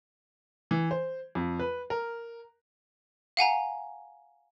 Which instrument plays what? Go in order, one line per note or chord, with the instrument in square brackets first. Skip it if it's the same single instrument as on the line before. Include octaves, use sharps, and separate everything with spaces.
[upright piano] E3
C5
F2
B4
A#4
[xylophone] F5 F#5 G#5 A#5